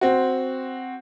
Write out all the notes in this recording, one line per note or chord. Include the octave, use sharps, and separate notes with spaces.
C4 F#4